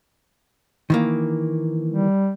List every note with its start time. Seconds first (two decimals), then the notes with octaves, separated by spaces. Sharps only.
0.90 D#3 E3 A#3
1.89 G3